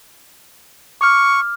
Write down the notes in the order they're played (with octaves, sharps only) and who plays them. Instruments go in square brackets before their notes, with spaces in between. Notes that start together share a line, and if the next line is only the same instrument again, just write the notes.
[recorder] C#6 [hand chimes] D6 F6